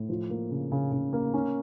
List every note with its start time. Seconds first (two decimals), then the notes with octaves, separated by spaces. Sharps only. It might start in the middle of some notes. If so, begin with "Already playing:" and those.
Already playing: A2
0.09 F3
0.30 A#3
0.51 C#3
0.72 C#3
0.92 C#3
1.13 A#3
1.34 C#4